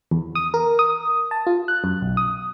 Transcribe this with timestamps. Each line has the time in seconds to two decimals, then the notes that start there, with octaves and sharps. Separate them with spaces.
0.11 E2
0.35 D#6
0.54 A#4
0.79 D#6
1.31 A5
1.47 F4
1.68 F#6
1.84 F#2
2.02 B1
2.17 D#6